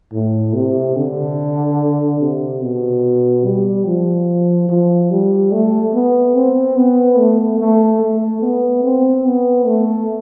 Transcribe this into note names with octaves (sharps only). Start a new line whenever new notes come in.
A2
C3
D3
C3
B2
G3
F3
F3
G3
A3
B3
C4
B3
A3
A3
A3
B3
C4
B3
A3